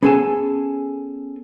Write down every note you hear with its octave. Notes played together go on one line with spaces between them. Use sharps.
B3 C#4 G#4 A4 G#5 A5